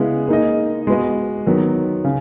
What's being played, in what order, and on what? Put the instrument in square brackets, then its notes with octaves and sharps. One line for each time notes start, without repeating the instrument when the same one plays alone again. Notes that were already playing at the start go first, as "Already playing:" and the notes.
Already playing: [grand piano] C#3 G#3 B3 E4 G#4
A#3 D#4 G#4 D#5
G#3 B3 F#4 B4 D#5
D#3 F#3 B3
C#3